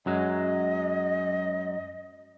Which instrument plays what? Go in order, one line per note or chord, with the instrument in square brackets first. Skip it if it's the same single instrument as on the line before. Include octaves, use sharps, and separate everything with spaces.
[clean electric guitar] F#2 F#3 G#3 [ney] D#5